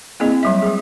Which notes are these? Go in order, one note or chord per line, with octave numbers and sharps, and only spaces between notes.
A#3 C4 E4 G#4 D#5
F#3 G3 E5
G#3 G#4